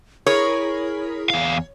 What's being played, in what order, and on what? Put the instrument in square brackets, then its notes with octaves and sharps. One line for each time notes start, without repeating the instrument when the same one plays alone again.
[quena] E4 [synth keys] G#4 A#4 B5 [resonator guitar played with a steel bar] C#5
[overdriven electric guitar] E2 F5